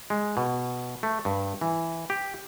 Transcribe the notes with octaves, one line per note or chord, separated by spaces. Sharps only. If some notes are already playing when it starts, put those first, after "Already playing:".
G#3
B2
A3
G2
E3
G4